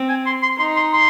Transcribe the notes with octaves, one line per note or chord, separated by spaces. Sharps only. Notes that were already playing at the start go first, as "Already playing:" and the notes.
Already playing: C4
G#5
C6
C6
D#4 C6
C6
C6